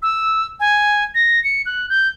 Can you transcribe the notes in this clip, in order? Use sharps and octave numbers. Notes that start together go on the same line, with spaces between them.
E6
G#5
A#6
C#7
F#6
G6